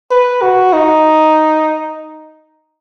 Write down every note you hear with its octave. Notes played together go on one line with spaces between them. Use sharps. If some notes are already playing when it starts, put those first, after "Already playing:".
B4
F#4
D#4